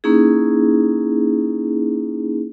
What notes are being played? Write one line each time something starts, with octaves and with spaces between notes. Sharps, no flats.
A#3 C#4 D#4 E4 G#4